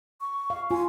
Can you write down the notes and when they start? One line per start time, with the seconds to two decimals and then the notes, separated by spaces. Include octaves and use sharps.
0.21 C#6
0.50 F5
0.71 F4 G#5